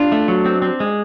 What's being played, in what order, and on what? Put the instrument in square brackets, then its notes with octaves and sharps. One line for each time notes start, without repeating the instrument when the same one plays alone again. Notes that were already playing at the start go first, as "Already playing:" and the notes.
Already playing: [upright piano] D4 [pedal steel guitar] F4
[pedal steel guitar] A3
F#3
C4
C4
G#3